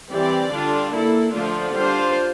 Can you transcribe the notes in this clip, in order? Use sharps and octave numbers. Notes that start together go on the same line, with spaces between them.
E3 G3 C4 G4 D5
D3 G3 D4 F4
A#3 E4 A4
D3 F3 A3 D4 F4
G3 D4 F4 C5